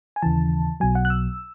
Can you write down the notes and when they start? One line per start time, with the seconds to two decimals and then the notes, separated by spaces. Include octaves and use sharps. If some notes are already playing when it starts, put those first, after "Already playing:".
0.16 G#5
0.22 D#2 C#3 E3 A5
0.80 B1 B2 F#3 G#5
0.95 F#5
1.05 F#6
1.10 E6